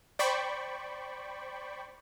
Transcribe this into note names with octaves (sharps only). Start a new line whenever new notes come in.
C5 D5 G5 B5 C#6